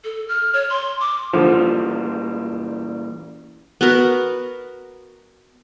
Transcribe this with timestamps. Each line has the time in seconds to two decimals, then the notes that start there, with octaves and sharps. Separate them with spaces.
0.04 A4
0.28 F6
0.53 C#5
0.70 C6
1.00 D6
1.33 A#2 D3 E3 F3 G3
3.81 B3 F#4 A#4 B4